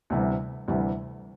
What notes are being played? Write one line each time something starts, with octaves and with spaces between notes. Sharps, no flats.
D2 C3 E3 G3
D2 C3 E3 G3